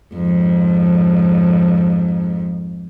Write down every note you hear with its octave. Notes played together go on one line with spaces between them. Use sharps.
F2 G#2